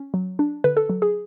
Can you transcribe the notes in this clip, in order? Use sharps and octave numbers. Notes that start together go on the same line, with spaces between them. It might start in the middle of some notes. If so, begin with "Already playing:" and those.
Already playing: C#4
F#3
D4
D3 B4
A4
F#3
G#4